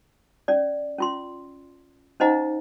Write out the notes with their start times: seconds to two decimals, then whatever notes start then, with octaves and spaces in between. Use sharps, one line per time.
0.48 C#4 D5
0.99 C#4 F4 C6
2.20 C#4 D#4 C5 D#5 F#5 A#5